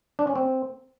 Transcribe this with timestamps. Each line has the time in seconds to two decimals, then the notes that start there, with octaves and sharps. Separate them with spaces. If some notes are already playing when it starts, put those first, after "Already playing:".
0.19 D4
0.27 C#4
0.35 C4